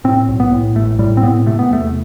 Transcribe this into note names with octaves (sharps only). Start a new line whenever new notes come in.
A2 C4
B1
B3
A2
A1 A3
A2 G3
C4
A2 B3
C3 A3
B3
E2 A3